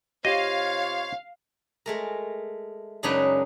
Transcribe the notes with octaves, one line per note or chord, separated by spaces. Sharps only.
C3 F4 G4 C#5 D#5 F5
G#3 A3 A#4
F#2 C#3 G#3 D4 D#4 B4